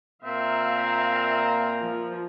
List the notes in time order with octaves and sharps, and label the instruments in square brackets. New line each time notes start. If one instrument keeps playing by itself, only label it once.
[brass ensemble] A#2 A#3 A#5 [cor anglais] C4 [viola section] E5 F5
[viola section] F3